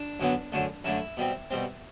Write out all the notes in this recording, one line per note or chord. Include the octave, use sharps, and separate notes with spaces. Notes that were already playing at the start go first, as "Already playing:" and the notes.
Already playing: D4
F#2 D3 F#3 B3
F#2 D3 A3
F#2 D3 A3 E4
B2 G3 C4
B2 G3 C4